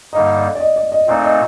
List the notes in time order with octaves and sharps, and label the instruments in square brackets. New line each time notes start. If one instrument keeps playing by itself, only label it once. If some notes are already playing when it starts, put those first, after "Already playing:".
[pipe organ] G2 D3 G3 A#3 D#4 [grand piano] D#5
[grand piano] D5
D5
D#5
D5
D#5
[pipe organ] A#2 A3 C4 D#4 [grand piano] D5
[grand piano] D#5